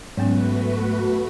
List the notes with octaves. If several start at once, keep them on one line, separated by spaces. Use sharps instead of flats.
G#2 F#3 A3 B3 C#4 F#4 B4